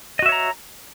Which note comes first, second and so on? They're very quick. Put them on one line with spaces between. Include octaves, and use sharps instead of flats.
D#5 F#4 E5 C#5 A#5